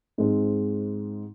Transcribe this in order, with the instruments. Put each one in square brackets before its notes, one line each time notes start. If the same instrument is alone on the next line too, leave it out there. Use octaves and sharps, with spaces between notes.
[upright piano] G#2 G#3 C4